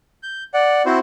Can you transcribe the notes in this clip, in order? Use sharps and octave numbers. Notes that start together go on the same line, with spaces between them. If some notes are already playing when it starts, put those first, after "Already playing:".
G6
D5 F#5
C4 E4 F#4 C5